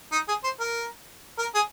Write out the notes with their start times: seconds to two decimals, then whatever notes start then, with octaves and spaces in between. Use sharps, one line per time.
0.12 D#4
0.28 G#4
0.44 C5
0.60 A#4
1.38 A#4
1.55 G#4